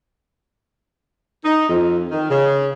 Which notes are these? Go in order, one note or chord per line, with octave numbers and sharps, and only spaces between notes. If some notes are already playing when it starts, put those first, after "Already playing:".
D#4
F2
D#3
C#3